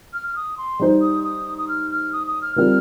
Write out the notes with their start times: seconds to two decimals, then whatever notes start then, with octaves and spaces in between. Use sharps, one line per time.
0.13 F6
0.27 F6
0.36 D#6
0.58 C6
0.79 G3 D#4 C5
1.01 D#6
1.24 D#6
1.58 D#6
1.69 F6
1.91 F6
2.13 D#6
2.27 D#6
2.42 F6
2.56 G3 C4 F4 A#4 F6